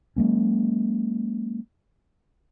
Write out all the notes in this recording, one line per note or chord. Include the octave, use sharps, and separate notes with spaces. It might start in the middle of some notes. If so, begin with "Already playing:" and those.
F#3 G#3 A#3 C#4